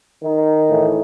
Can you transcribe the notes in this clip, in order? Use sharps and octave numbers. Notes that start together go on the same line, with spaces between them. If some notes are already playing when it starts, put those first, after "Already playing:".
D#3 D#4
A2 E3